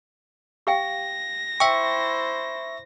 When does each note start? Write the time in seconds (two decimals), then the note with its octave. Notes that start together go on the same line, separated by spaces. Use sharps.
0.67 G4 F5 G5 A#6
1.60 E4 C5 E5 G5 C#6